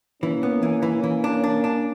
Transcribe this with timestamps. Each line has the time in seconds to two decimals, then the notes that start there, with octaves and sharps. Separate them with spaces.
0.22 E3 A#3 C#4
0.43 B3
0.63 E3
0.82 E3
1.04 E3
1.24 D4
1.44 D4
1.64 D4